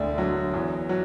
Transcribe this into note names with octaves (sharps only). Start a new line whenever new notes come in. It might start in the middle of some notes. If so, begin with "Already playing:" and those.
Already playing: E1 D2 D3 D5
F#3
E2
F#3